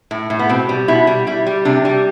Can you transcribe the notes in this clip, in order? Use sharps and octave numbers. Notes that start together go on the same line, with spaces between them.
A2
A2
B3
B2 C4
G3
B2 E4
G3
G3 E4
G3
C3 D4
G3